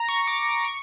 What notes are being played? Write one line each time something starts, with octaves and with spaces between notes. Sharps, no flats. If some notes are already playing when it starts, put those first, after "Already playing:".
Already playing: A#5
C#6
D6
C#6